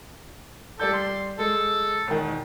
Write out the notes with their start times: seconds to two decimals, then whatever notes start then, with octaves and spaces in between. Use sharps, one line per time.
0.80 G3 A4 D5 G6
0.94 C6
1.39 G#3 A4
2.08 E1 D#3